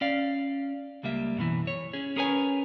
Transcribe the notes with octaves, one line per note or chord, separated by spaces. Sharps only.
C#4 D5 F5
C#2 G3 A#3 E5
F#2 B2 D3 E3
C#5
C#4 G#4
C#4 G#4 A#4 B4 C#5 G#5